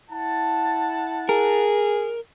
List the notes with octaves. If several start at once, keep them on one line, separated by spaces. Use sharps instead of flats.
E4 F#5 A5
G#4 A#4